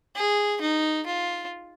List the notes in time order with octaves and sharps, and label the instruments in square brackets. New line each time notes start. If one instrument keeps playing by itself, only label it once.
[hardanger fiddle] G#4
D#4
F4